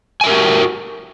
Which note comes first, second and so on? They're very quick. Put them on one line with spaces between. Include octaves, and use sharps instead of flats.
G#5 E5 A#4 G4 F#4